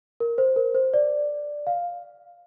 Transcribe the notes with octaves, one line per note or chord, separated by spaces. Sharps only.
A#4
C5
A#4
C5
D5
F5